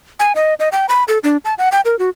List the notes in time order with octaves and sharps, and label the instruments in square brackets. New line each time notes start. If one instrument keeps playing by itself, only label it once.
[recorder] G#5
D#5
D#5
G5
B5
A4
D4
A5
F#5
G5
A#4
F#4